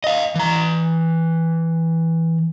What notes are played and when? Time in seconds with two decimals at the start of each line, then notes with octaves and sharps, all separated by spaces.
0.04 D#5 F5
0.35 E3 A#5